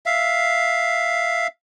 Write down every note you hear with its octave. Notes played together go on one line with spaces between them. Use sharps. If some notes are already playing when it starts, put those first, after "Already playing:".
E5 F5